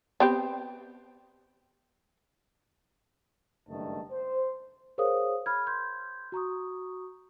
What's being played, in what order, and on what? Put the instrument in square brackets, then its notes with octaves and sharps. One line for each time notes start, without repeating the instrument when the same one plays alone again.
[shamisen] B3 C4 G4
[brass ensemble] F#1 G2 D#3 A3 D#5 A5
C5
[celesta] G#4 A#4 C5 C#5 F5 D#6
B5 F6 G#6
C6 G6 G#6
F#4 A#5 C#6 D#6